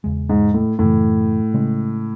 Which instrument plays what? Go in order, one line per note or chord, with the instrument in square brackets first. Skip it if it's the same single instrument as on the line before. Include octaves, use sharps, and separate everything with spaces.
[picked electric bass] E2 C#3 G#3
[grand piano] G#2
A2
[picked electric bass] F#2 C#3 E3 [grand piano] A2
[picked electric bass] C#3 G#3 C#4